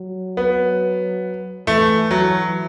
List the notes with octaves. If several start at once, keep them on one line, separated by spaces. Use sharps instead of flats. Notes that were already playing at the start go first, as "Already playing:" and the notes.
Already playing: F#3
B3
E3 A3
F#3